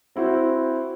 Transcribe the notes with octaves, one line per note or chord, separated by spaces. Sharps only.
C4 E4 F#4 C5